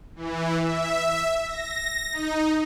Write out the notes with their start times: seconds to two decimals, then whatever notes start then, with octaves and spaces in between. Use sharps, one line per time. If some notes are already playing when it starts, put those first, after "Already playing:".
0.16 E3
0.59 E5
1.47 A#6
2.11 D#4